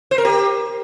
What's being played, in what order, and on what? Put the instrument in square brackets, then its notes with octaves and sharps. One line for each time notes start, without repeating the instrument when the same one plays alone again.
[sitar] C5
A#4
G4